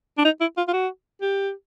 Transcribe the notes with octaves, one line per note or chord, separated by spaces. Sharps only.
D4
D#4
E4
F4
F4
F#4
G4